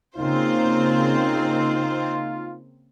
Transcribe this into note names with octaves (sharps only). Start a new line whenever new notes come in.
C#3 A#3 C4 D#4 F4 C5